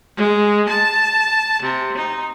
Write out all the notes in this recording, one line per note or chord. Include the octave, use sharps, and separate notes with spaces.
G#3
A5
C3
D#4